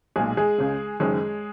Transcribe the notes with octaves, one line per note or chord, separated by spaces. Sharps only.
B1 A#2 G#3 G#4
G#3 G#4
C#2 C#3
F#1 F#2 D#3 G#3 G#4